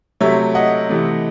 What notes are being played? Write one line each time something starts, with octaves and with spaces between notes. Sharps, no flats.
C3 F#3 A3 C#5 E5
D#5 F#5
C3 E3 A3